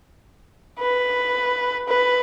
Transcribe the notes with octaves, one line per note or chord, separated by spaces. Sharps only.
B4
B4